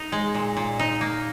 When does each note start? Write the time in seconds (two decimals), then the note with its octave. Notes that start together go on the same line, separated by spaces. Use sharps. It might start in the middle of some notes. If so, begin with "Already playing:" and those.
Already playing: D#4
0.12 G#3
0.35 A#2
0.57 A#2
0.79 D#4
1.01 A#3